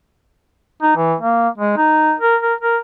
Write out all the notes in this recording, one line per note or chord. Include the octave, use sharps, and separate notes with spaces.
D#4
E3
A#3
G#3
D#4
A#4
A#4
A#4